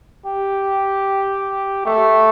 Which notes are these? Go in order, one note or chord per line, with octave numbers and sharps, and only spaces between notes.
G4
A3